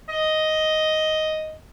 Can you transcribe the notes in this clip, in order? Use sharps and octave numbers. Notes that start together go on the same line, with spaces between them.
D#5